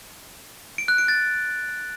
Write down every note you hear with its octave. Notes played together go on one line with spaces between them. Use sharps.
D7
F#6
D7
A6